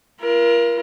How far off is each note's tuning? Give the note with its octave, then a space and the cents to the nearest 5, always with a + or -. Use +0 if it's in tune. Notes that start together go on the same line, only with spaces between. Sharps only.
F4 -35 A#4 +30